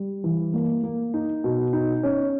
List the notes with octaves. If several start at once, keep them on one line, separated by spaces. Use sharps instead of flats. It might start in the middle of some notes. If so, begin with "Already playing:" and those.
Already playing: G3
E3
A#3
A#3
D#4
B2
D#4
C#4